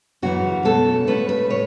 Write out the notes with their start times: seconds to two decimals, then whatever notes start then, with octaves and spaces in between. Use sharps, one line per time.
0.22 F#2 C#3 E3 F#4
0.65 B2 A3 C#4 A4
1.07 C#3 A3 C#4 B4
1.29 B4
1.50 A2 C#5